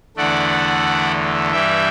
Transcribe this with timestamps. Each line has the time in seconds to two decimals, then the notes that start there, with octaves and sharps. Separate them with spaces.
0.17 E2 D3 A3 D5 F#5
1.52 G2 E3 G3 E5 G5